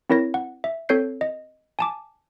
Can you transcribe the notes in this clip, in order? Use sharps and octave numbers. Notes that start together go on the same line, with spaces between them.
C4 E4 A#4 C#5 A#6
F#5
E5
C4 A4 C#5 G6 C7
D#5
G#5 A5 D6